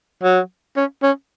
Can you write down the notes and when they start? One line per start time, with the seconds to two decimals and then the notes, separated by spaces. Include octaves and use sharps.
0.23 F#3
0.77 C#4
1.03 C#4